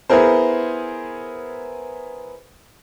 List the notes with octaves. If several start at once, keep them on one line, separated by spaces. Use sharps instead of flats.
B3 E4 G#4 A#4 C5